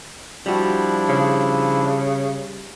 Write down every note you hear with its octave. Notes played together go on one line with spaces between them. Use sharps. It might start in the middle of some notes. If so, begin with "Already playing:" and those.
F3 G3 D4 E4 F#4
C#3